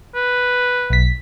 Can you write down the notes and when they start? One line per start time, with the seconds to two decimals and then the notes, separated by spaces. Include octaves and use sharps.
0.15 B4
0.90 B1 B6